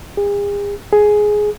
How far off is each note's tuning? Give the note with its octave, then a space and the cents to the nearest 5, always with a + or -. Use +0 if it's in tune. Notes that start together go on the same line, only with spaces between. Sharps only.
G#4 -40
G#4 +10